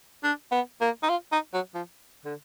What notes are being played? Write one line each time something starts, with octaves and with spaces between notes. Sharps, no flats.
D4
B3
A#3
D#4
F4
D#4
F#3
F3
D3